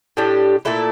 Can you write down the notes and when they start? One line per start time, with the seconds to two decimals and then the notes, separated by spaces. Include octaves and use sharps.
0.17 A2 G3 D4 G4
0.65 A#2 A3 E4 A4